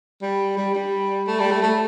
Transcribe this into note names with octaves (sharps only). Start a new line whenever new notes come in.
G3
G3
G3
A3
G3
A3
A3